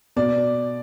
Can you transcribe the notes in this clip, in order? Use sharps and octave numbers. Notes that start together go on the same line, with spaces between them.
B2 D5